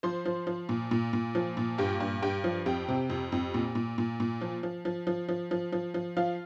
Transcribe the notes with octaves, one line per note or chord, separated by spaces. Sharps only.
F3 C5 C6
F3
F3
A#2
A#2
A#2
F3
A#2
G2 G4 G5
G2
G2 G4 G5
F3
F2 G4 G5
C3
F2
F2
A#2
A#2
A#2
A#2
F3
F3
F3
F3
F3
F3
F3
F3
F3 F4 F5